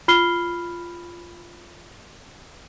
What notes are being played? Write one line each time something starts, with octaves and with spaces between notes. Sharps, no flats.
F4 B5 F6 C7 G7